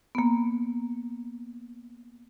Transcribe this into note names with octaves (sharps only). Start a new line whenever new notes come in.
A#3 B3